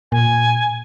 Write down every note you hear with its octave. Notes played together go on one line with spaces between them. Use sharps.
A#2 G#5